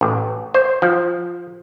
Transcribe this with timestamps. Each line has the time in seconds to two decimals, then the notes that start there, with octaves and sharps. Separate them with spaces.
0.01 A1
0.54 C5
0.82 F3